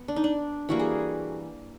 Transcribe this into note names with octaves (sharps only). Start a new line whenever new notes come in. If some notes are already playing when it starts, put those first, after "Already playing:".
Already playing: B3
D4
D#4
D4
E3 G3 A#3 F#4
G#4